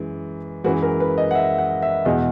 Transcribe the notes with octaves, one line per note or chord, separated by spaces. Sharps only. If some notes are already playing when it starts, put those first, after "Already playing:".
Already playing: F#2 E3 G#3
F#2 E3 G#3 F#4
A#4
B4
D#5
F#5
E5
F#5
E5
E2 B2 G#3 D#5